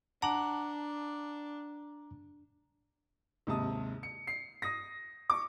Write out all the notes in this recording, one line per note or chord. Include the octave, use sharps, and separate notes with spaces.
D4 F#5 A5 A#5 D6 F#7
D#2 G#2 C3 A5 D#6
C#7
C7
D#6 A#6
C#6 D6